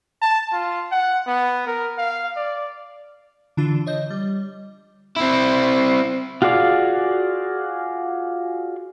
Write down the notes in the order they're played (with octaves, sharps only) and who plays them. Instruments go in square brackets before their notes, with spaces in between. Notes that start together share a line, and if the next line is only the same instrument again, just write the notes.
[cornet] A5
F4
F#5
B3
A#4
F5
D5
[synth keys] D3 E3 D4 F4
C#5 D#5 G6
G3
[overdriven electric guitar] C4 E4
[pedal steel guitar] F4 F#4 G#4 D5 F5